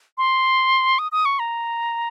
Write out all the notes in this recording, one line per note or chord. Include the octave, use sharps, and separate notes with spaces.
C6
D#6
D#6
C#6
A#5